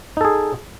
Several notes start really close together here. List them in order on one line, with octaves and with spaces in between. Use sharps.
D#4 A4 G#4